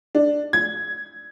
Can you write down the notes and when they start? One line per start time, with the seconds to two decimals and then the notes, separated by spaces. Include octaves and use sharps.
0.15 D4
0.53 G#6